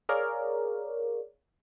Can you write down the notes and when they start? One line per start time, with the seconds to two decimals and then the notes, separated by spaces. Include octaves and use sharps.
0.09 G#4 A#4 C#5 D5 F5